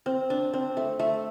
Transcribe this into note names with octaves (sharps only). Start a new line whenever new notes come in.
C4
D4
C4
A3
A3